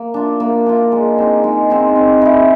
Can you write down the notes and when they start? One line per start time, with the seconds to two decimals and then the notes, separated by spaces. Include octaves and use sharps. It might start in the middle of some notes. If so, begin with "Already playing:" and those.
Already playing: A#3
0.14 D4 F4
0.40 A#3
0.66 D4 F4
0.92 G#3
1.18 C4 D#4
1.44 G#3
1.70 C4 D#4
1.96 C4
2.22 E4 G#4